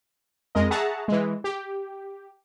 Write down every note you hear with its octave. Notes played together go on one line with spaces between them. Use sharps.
F2 G#3 A#4 D#5
G#4 E5 F#5 A5 A#5 C#6
E3 G#3
G4